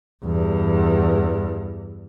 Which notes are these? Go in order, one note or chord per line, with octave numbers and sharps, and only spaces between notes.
E2 G2